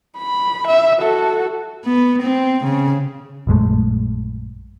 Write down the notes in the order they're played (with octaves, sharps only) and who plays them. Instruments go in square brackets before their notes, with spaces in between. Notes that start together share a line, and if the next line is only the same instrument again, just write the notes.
[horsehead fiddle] B5
E5
F#4 A4
[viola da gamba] B3
C4
C#3
[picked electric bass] A#1 F#2 G#3 A3